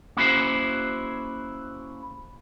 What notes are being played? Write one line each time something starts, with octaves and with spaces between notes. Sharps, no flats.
A#3 C#4 E4 F#4 G#4 C5